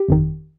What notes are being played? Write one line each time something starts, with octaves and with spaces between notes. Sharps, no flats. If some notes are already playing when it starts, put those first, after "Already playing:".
Already playing: G4
G1 F2 D#3